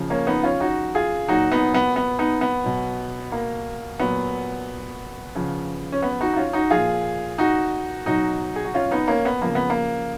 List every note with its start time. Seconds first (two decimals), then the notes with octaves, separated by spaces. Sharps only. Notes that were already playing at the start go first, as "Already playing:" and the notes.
Already playing: C#3 F3
0.10 A#3 C#4
0.27 B3 D#4
0.43 C#4 F4
0.60 D#4 F#4
0.95 F4 G#4
1.28 A#2 F#3 D#4 F#4
1.51 B3 D#4
1.74 B3
1.96 B3
2.19 B3 D#4
2.41 B3
2.64 B2 F#3
3.32 A#3
4.00 A#2 F#3 B3
5.35 C#3 F3
5.92 C#4
6.03 B3
6.20 D#4 F#4
6.33 D#4
6.37 C#4 F4
6.53 D#4 F#4
6.70 A#2 F3 F4 G#4
7.38 D#4 F#4
8.06 B2 F#3 D#4 F#4
8.56 G#4
8.65 F#4
8.74 C#4 F4
8.91 B3 D#4
9.08 A#3 C#4
9.25 B3
9.41 C#3 F3 A#3
9.55 B3
9.70 A#3